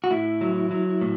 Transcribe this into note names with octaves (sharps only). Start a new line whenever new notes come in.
F#4
A2 E4
F#3
F#3
A2